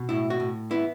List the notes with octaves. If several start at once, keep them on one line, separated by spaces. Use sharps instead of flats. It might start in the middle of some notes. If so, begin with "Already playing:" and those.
Already playing: B2
A2 E4
F#4
A2
B3 E4